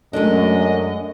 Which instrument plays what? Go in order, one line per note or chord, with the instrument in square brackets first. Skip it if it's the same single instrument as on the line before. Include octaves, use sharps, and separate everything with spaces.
[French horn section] F#2 [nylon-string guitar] G#3 A3 D4 [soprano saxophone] D#5